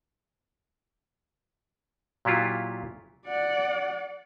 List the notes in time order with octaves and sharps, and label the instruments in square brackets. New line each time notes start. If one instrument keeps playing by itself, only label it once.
[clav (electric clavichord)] A#2 F#3 E4 F4 G4
[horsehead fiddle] D5 F#5